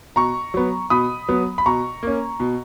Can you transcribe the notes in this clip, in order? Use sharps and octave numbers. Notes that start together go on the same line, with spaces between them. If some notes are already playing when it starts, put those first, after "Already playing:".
B2 A#5 C#6
F#3 B3
B2 B5 D#6
F#3 B3
B5
B2 A#5 C#6
A#3 C#4
B2